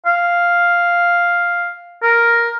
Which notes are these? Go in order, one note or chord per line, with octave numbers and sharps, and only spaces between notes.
F5
A#4